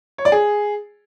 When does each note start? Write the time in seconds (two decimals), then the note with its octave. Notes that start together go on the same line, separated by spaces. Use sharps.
0.18 C#5
0.25 D5
0.32 G#4